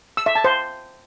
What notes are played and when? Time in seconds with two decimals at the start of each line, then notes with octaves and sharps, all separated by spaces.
0.17 E6
0.26 E5
0.35 A5
0.44 C5